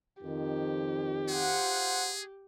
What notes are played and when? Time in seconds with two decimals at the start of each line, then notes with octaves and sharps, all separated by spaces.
0.23 F2 D#3 G4
1.29 F4 G#4 C5 F#5